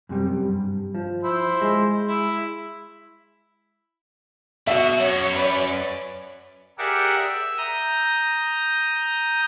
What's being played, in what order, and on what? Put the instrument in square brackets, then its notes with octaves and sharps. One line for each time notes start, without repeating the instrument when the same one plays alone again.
[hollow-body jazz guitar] F#2 C3 G3
G2
F3
[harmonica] E4 C5
[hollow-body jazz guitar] G#3
[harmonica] E4
[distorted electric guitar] B2 [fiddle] F#4 [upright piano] E5
[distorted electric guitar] F#2 [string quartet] C#5
[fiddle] B4 D5
[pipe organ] G4 G#4 A#4 D5 E5 F#5
E5
A#5 D#6 G6